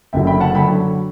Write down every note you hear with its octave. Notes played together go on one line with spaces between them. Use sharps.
F#1 F#2 D3 F#3 E5 G5
G5 B5
F#5 A5
D3 F#3 G5 B5